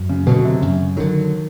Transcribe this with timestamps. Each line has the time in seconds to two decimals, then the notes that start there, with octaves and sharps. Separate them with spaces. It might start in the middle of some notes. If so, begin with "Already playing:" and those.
Already playing: F#2
0.09 C#3
0.26 B2 D3 F#3
0.44 C3
0.62 F#2 C#3
0.97 D3 D#3 F#3